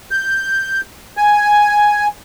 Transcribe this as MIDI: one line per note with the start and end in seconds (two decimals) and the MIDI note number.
0.11 0.81 91
1.17 2.08 80